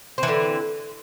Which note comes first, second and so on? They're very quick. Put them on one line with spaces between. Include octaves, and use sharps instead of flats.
C4 E3 D3